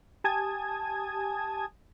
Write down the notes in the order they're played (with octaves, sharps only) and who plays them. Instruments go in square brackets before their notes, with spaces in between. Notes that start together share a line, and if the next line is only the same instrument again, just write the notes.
[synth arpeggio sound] G4 G#5 A5 D#6 G#6